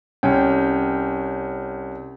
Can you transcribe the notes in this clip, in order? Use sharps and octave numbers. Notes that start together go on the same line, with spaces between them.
C2 C#4 G5